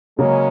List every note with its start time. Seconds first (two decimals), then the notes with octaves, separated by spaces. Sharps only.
0.18 C#3 F#3 G#3 A#3 C#4